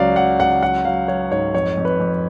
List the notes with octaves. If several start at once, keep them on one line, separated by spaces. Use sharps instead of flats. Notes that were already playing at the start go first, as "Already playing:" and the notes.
Already playing: C#2 F#3 D5 F5
F#3 F#5
C#2 F#5
F#3 F#5
F#3 F5
F#3 C#5
G#2 C#5
F2 C#5
F2
B4
F2